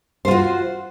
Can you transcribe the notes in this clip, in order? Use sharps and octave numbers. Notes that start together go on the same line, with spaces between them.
F4 F#4 C5